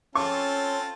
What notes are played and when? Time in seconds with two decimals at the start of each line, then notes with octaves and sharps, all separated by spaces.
0.15 C4 C#4 F4 A4 C#6